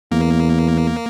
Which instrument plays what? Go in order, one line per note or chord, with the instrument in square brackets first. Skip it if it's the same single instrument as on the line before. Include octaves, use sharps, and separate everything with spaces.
[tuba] E2 [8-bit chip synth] A#3